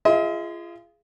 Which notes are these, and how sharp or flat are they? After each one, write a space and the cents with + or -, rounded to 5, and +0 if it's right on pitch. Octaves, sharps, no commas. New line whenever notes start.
F4 -30 G#4 +0 D#5 +40